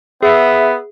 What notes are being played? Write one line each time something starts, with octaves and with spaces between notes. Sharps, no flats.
B3 G#4 E5